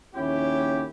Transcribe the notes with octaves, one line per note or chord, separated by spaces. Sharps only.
A#1 D#2 C#4 E4 F#4 G4